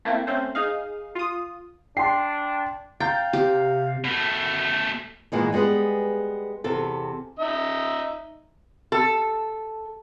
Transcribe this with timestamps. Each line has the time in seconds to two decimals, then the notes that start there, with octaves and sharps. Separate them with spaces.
0.05 A3 A#3 C4 E4
0.27 A3 C4 C#4 C5
0.55 D#4 G#4 F5
1.15 F4 D#6
1.97 D4 G5 C6 C7
3.00 F5 G5 A#5 G6 A6
3.33 C3 G4
4.05 B2 A3
5.32 A#2 E3 G#3 B3
5.52 G3 G#3 B3 G#4 B4
6.64 E2 C3 A4
7.39 D#4 E5
8.92 A4